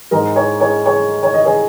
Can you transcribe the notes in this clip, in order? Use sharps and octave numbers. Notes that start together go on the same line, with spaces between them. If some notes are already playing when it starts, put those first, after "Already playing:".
G#2 G#3 A#4 D#5
G#4 C#5
G#4 C#5
G#4 C#5
C#5
D#5
G#4 C#5